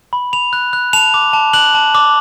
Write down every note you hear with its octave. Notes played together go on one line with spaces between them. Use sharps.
B5
B5 F7
F#6
F#6
A5 F7
D6
A5
F#6 F#7
A5
D6